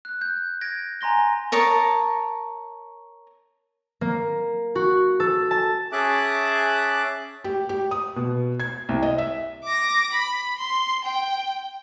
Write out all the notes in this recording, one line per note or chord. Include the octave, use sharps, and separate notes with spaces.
F#6
G6
G#6 A#6 D7
G#5 A#5 C6 A#6 G7
A#4 C#5 A5 D#6
A#3
F#4
A4
A5
C#4 G#4 E5 A5 D6 F#6
G4
G4
D#6
B2
G#6
C2
D#5
E5
D6 A#6
B5
C6
G5